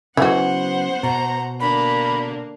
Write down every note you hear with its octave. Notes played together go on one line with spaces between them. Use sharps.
C#3 E3 F#3 B3 F#4 C5 F#5
B2 A#5
D3 A#3 D4 B5